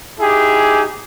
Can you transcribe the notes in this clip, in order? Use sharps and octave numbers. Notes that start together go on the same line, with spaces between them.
D#4 E4 G4 G#4